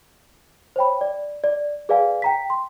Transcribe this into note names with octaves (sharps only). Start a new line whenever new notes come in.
C5 C#5 G5 B5
D5
D5
G#4 B4 D5 F5 G#5
G5 A#5 B6
C6